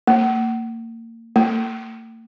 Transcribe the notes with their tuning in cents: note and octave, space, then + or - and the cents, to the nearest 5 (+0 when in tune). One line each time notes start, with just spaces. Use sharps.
A#3 -30
A#3 -45